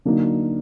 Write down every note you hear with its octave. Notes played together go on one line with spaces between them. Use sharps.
D3 F#3 A#3 D#4